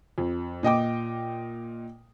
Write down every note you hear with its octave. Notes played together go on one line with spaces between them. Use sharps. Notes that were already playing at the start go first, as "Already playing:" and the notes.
F2
A#2 D#5 G5 D6